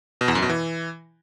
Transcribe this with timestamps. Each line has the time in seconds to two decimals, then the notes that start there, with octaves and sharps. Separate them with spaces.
0.21 B2
0.28 E2
0.35 F#2
0.42 B2
0.49 E3